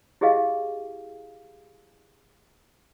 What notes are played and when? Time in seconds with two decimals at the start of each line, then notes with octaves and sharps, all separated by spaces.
0.21 E4 G4 G#4 D#5 F5